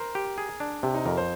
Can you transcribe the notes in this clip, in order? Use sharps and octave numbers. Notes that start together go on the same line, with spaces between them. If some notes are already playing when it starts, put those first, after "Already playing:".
Already playing: A#4 C5
G4
G#4
D4
C3 G4
D#4
F2 A#4
C5